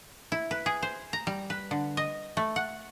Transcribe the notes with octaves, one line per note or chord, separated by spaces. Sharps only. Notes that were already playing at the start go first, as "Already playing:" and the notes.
E4
B4
G#4
C5
A#5
G3
B4
D3
D#5
A3
F#5